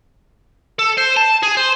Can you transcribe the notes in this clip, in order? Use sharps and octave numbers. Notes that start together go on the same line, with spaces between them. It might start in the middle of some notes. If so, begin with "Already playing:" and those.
A4
C5
A5
G#4
C5